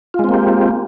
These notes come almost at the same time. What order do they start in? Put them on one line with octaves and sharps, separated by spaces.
F4 G#3 C4 A#3 G4